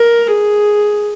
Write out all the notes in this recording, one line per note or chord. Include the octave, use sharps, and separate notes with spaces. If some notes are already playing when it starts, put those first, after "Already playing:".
Already playing: A#4
G#4